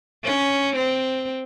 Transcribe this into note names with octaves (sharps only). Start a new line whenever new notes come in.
C#4
C4